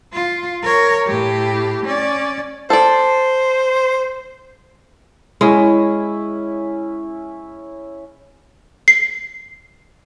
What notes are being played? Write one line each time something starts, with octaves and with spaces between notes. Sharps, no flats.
F4
A#4 C#5
A2 G4
C#4 D5
A4 C5 D5
G#3 C#4 E4
C7